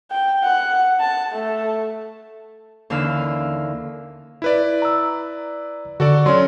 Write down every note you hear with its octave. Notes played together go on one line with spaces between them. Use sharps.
G5
F#5
A5
A3
D#2 D3 E3 C#4 F5 E6
E4 B4 D5
A#5 E6
D3 F#4 A4 D5
F#3 C#4 D5 C6